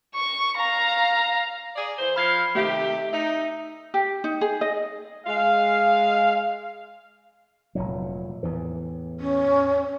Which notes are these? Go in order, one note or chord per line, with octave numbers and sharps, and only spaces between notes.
C#6
F5 A#5
G#4 D5
E3 C5
F3 F5 B5 G#6 C7
C3 D#3 A3 G4 E5
D#4 E5
G4
D#4
G#4
D#5
G#3 F5
F1 A#2 F#3
E2 A2 E3
C#4